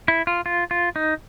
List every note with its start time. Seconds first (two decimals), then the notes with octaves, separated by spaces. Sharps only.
0.08 E4
0.27 F4
0.46 F4
0.71 F4
0.96 D#4